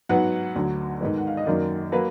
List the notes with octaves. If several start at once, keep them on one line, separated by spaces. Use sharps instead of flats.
G#2 F#3 B3 F#5
D2 D3 F#3
G#2 D#3 G#3 B3
F#5
F5
D#5
F#2 D#3 F#3 A#3 D5
F#3 A#3 B4